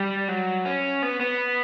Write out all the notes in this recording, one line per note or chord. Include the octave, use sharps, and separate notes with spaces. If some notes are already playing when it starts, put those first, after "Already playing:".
Already playing: G3
F#3
C#4
B3
B3